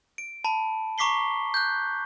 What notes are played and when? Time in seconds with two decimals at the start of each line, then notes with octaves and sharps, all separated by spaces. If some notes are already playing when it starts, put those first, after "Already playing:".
0.18 D7
0.44 A5 B5
0.98 A#5 C#6 D6 B6 C7 G7
1.54 F#6 G6